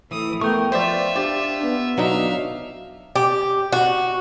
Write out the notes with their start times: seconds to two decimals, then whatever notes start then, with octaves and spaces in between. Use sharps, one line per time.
0.11 A2 E3 D#6
0.41 A3 B3 A#4 G5 C#6
0.72 F3 F4 C5 D5 E5
1.16 D4 G4 D5
1.63 B3
1.98 B2 F#3 D4 D#4 E5 F5
3.16 G4
3.72 F#4